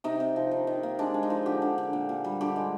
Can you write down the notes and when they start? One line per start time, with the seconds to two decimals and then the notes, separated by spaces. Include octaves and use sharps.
0.04 C3 D#4
0.20 C3
0.36 F3
0.51 D#3
0.67 D#3
0.83 A#3
0.99 G#3 D4
1.14 G#3
1.23 D#4
1.30 F3
1.46 D3 G4
1.62 D3
1.78 D3
1.93 A#2
2.09 A#2
2.24 G3
2.41 D3 G4
2.56 G#3